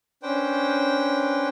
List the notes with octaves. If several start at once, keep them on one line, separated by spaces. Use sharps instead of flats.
C#4 D4 B4 C5 G5